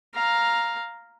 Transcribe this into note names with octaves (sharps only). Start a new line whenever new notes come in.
F5 A#5